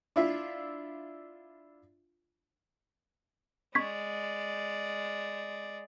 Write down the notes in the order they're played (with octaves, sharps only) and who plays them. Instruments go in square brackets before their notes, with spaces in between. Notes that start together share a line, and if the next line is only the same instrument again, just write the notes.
[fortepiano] D4 E4 F4 E5
[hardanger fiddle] G#3 D5 [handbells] C#6 G#6 B6